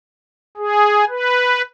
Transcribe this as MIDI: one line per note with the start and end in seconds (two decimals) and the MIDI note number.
0.57 1.05 68
1.09 1.62 71